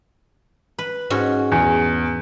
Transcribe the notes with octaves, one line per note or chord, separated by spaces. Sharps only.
B4
G#2 C#4 F#4
E2